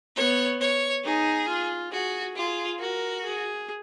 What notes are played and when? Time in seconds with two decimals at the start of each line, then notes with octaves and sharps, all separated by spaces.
0.16 B3 C#5
0.61 C#5
1.04 D#4 G#4
1.48 F4
1.92 F#4 G#4
2.36 F4 G#4
2.80 F#4 A#4
3.24 G#4